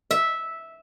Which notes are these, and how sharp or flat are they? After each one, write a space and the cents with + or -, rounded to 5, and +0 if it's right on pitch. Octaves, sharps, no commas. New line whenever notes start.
E5 -10